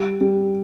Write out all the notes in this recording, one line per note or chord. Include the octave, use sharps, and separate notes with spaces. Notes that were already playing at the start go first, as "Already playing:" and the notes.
Already playing: G3
G3